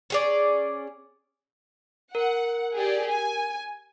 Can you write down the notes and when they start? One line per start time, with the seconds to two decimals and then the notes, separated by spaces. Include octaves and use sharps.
0.10 C#4 G#4 D5
2.15 A#4 F#5
2.75 G4 G#4 D5
3.09 G#5